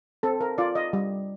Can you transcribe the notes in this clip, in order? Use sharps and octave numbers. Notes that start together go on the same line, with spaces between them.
C4 A4
A#4
F4 D5
D#5
G3